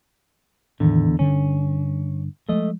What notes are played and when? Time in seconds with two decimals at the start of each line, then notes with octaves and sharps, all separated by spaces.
0.80 E2 A2 D3 D#3 B3
1.19 G2 D3 C#4
2.49 F3 G#3 A3 D#5